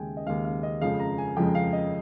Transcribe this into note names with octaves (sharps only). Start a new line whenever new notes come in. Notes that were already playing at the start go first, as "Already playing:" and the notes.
Already playing: D#2 C#3 G#3 G5 G#5
D#5
D#2 C#3 G#3 F5
F5
D#5
F2 C#3 F3 G#3 F5
A#5
G#5
F2 C#3 F3 G#3 G5
F5
D#5